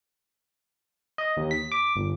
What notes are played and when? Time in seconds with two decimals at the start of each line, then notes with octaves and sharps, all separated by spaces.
1.18 D#5
1.37 D#2
1.51 B6
1.72 D6
1.96 G1